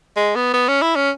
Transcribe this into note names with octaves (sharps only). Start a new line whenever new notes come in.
G#3
B3
B3
C#4
E4
C#4